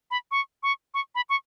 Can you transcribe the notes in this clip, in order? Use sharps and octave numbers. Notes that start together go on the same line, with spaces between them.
B5
C#6
C#6
C#6
B5
C#6